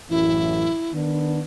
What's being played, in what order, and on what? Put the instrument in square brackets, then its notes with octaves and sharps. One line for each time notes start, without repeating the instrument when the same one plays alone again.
[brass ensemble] A1 F#2 E3 [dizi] E4
[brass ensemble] D#3 B3 D4